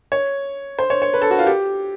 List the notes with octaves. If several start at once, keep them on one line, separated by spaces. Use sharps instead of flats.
C#5
C5
C#5
C#5
B4
A4
F#4
F4
G4